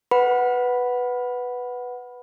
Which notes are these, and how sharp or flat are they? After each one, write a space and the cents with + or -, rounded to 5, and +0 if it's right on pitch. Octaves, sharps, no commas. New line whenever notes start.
B4 +0 F#5 +0 B5 +0